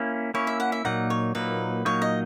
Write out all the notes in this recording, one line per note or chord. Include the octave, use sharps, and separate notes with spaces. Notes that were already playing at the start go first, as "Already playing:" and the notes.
Already playing: A#3 C#4 E4
A#3 C#4 E4 C#5
E5
F#5
E5
A#2 F#3 A#3 D#4 F#5
C#5
A#2 F#3 A#3 D#4 B4
A#2 F#3 A#3 D#4 C#5
D#5